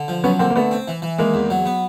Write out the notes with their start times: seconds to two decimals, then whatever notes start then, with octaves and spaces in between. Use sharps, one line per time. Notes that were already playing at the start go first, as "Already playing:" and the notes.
Already playing: D3
0.08 F3
0.24 F#3 B3 C#4
0.39 D3 A#3 C4
0.50 A#3
0.56 D3 A3 B3
0.71 C4
0.88 E3
1.02 E3
1.18 D#3 G#3 A#3
1.34 E2
1.50 F#3
1.66 B3